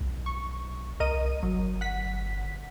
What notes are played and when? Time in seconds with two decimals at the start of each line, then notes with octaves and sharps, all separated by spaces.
0.01 B1
0.26 C#6
1.00 C2 A#4 D#5 D#7
1.43 G1 F#3
1.81 F#5 B6